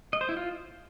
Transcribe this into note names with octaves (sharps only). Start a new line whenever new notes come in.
D#5
C5
E4
F4